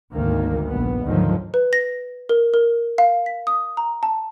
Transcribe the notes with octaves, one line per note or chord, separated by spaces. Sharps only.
G#1 D2 D#3 A#3
A#1 G2 B3
D2 G#2 D3 D#3 F3 F#3
B4
A#6
A#4
A#4
F5
B6
D#6
A#5
A5